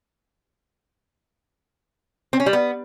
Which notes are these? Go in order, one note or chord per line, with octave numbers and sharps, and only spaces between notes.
C4
C#4
G3
B3